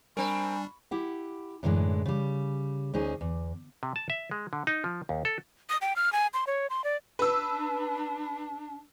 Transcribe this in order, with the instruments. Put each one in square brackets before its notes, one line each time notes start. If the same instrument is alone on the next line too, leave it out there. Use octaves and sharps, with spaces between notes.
[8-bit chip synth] G3 D4 [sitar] C4 A#4 [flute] G#5 [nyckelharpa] B5 C#6
[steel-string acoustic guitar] E4 G4 F#5
F#2 A2 D3 E3 G#3
C#3 G3
D2 C#4 D#4 G#4
E2
[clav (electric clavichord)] C3
A5
E5
G#3
D3
D#4
F3
D#2
A4
[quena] D#6
G5
F6
G#5
C6
C#5
C6
D5
[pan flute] D4 [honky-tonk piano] B4 E6